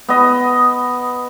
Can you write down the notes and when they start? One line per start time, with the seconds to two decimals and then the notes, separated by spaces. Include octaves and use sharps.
0.09 B3 D#5